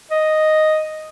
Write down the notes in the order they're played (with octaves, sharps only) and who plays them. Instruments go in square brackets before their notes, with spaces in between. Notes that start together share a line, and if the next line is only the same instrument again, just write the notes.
[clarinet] D#5